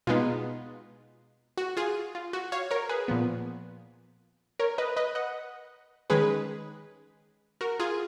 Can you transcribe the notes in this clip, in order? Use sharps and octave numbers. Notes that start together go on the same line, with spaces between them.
B2 G#3 B3 D#4 F4
F#4
F4 G#4
F4
F#4
C#5 F5
A#4 C#5
G#4 B4
A#2 F3 B3
A#4 C#5
B4 D#5
B4 D#5
D#5 F#5
D#3 G#3 C#4 G#4 B4
F#4 A#4
F4 G#4